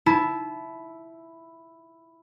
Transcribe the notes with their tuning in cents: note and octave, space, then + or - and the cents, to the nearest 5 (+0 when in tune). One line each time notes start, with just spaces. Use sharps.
E4 +0 A5 -25